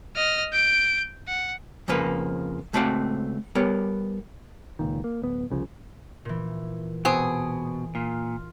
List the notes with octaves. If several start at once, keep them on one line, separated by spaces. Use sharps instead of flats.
D#5 F6
G6 D7
F#5
F2 C#3 F3 A#3 B4
C#2 A3 C4 F#4 F5 G5
G3 B3 A#4 C#5
C#2 A#2 D#3
A#3
D1 B3
C2 C#3 F3
A#2 E3
B2 B3 C4 G#4
A#2 F4